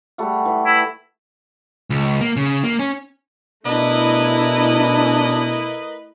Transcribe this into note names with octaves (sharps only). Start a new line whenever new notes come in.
G3 A3 F#5
E3
E4
C#2
A#3
C#3
A#3
C#4
B2 A3 D4 E4 A#4 B4 D#5